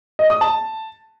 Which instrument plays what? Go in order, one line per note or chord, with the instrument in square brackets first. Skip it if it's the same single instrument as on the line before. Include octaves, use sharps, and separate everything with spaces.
[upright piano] D#5
D#6
A5